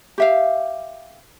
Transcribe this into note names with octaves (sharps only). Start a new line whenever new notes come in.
G4 E5 F5